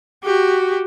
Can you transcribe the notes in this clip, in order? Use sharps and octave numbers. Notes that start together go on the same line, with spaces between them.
F#4 G4